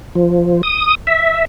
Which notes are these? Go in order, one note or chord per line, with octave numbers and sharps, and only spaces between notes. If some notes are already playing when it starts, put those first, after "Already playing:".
F3
D#6
E5